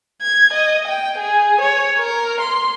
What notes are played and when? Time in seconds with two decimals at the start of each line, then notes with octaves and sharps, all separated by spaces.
0.22 G#6
0.53 D#5
0.88 G5
1.18 G#4
1.61 C#5
1.99 A#4
2.41 C6